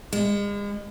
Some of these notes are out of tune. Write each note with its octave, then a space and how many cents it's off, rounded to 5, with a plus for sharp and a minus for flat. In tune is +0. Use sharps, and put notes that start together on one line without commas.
G#3 -35